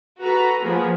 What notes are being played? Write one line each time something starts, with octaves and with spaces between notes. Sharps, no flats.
F#4 A4 B4 A#5
F3 A#3 B3 G#4